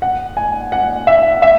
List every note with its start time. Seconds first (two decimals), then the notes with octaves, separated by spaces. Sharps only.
0.02 F#5
0.37 G#5
0.72 F#5
1.07 E5
1.42 E5